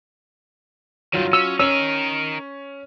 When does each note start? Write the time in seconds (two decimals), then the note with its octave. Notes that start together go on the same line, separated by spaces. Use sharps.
1.13 G2 D#3 F#3 F4
1.33 C#4 E6
1.60 C#4 D#4 A#4 E6